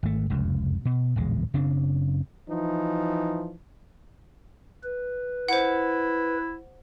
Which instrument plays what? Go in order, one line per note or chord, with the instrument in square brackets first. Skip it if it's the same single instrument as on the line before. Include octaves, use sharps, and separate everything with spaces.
[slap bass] G#1 A3
F1 C#2 F#2
B2
D1 A#1 E2 G#3
F#1 C#3 C4 D4
[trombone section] E3 F3 D#4
[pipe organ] B4
[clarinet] E4 [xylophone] C5 F#5